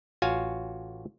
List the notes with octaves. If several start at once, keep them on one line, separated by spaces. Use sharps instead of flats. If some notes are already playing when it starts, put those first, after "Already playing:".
A1 F4 F#4 C#5 F5 G#5